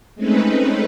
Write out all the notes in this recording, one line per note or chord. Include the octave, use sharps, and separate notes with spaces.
G#3 A3 C4 C#4 D#4 B4